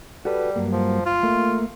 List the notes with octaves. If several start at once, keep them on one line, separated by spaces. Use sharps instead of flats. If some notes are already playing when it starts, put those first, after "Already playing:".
G3 F#4 A4 B4
G2 F#3 A#3
F3
F4
A3 A#3